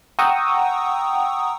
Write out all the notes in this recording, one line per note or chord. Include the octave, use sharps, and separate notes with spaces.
F#5 G5 A#5 C#6 D#6 E6